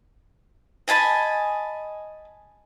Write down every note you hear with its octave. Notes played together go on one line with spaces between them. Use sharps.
D#5 G#5 A5 B5